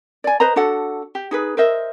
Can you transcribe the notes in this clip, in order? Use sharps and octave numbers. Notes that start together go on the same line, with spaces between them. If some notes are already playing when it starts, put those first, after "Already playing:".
D5 G#5
B4 C5 D#5 A#5
D4 F#4 A4 F#5
G4
D#4 G#4 B4
A#4 C5 D#5 E5